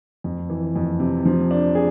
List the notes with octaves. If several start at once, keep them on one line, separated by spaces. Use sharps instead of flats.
F2
E3
F2
C3
F3
D4
G#4